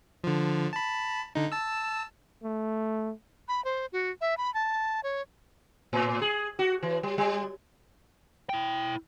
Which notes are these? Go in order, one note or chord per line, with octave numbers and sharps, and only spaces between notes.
D3 F3
A5 B5
D3 D#4
A5 E6
A3
B5
C5
F#4
E5
B5
A5
C#5
A2
G#4
F#4
E3
G3
G3
E4 G5